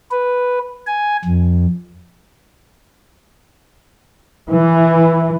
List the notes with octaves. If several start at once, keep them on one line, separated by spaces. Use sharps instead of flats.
B4
G#5
F2
E3